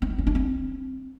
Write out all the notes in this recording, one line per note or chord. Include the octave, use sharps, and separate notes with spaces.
C4
D#4
C#4
D4
C4